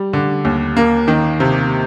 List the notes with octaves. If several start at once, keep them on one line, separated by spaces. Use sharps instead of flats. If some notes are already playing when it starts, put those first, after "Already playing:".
Already playing: G3
D3
D#2
A#3
D#3
C3